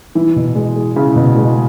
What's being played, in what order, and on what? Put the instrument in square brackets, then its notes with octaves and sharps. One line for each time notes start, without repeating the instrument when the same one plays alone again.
[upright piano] E3 [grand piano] E4
[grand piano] B2
G#3
G#4
[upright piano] C#3 [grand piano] E4
[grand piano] B2
G#3